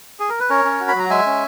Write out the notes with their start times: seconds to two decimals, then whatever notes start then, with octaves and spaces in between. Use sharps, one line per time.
0.20 G#4
0.29 A#4
0.40 B4
0.50 C#4 A#4 C#5
0.65 C#4
0.80 F#4
0.88 B5
0.95 F#3 A#5
1.10 G#3 E5 G#5
1.26 C#4